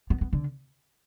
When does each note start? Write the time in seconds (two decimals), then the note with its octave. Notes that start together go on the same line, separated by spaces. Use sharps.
0.10 B3
0.21 B3
0.33 D3